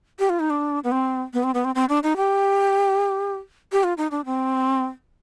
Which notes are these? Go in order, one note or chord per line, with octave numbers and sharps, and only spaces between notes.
G4
F4
D#4
D4
B3
C4
B3
C4
B3
C4
C4
D4
D#4
G4
G4
F4
D#4
D4
C4